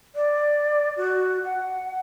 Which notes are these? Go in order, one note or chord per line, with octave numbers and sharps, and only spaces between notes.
D5
F#4
F#5